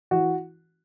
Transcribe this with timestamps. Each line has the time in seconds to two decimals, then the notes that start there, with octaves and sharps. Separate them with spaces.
0.11 E3 F#4